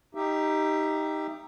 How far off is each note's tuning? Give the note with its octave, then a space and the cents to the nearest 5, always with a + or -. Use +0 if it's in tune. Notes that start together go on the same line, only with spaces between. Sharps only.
D#4 +0 G4 +5 E5 +25